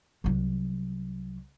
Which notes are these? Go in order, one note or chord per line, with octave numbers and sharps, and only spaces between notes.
C2 F#3